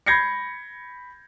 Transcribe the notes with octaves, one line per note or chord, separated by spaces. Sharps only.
B5 G6 G#6 A#6 C7 C#7